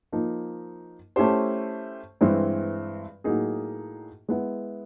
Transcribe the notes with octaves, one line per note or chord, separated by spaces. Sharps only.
F3 A#3 D#4
A3 C#4 E4 G4 C5
G2 E3 G#3 C4 E4
A2 F#3 A#3 D#4 G#4
G#3 B3 E4